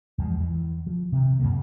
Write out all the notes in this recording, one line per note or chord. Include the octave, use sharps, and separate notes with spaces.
E2 F3 G#3
E3
F3
C3 D#3
F#2 A#2 C#3 A#3